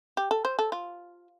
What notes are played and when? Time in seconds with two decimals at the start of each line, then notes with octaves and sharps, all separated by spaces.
0.17 G4
0.31 A4
0.45 C5
0.59 A4
0.72 F4